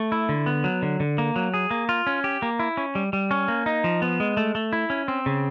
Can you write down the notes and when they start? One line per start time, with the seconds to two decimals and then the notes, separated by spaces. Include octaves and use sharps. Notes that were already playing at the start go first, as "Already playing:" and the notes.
Already playing: A3
0.12 E4
0.29 D3
0.46 B3
0.64 F#3
0.82 D3
1.00 D3
1.18 A#3
1.36 F#3
1.54 G#4
1.71 A#3
1.89 F4
2.07 C#4
2.24 G4
2.42 A#3
2.59 E4
2.77 C#4
2.95 G3
3.13 G3
3.31 C#4
3.48 A#3
3.66 D#4
3.84 F3
4.02 B3
4.20 G#3
4.37 A3
4.55 A3
4.73 E4
4.90 C#4
5.08 C4
5.26 C#3